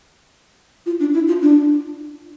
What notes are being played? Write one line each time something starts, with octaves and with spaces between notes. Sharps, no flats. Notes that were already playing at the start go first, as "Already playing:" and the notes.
F4
D4
E4
F4
D4